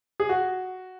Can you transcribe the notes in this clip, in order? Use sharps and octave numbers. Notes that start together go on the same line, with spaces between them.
G#4
F#4